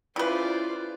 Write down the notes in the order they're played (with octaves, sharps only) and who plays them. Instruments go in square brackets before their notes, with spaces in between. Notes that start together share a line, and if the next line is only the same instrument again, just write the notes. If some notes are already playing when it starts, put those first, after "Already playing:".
[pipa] C#3 B4 [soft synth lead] E4 [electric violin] F4 [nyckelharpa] C5 D5